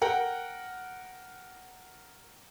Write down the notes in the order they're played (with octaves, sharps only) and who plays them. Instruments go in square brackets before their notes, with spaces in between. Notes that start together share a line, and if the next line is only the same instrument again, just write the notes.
[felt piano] A#4 F#5 G5